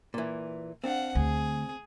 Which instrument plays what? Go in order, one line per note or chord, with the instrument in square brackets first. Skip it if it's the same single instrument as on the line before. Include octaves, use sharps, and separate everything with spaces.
[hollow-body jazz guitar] A#2 E3
[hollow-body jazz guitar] C4 D4 [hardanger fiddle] F5 F#5
[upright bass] D2 [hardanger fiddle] G#4